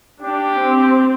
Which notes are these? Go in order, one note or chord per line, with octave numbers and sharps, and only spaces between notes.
D4 G4
C4